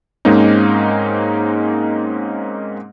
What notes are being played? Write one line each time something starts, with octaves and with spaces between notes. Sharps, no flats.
G#2 G#3 A#3 C4 C#4 D#4